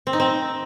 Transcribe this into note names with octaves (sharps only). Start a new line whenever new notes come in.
C4
D#4
C4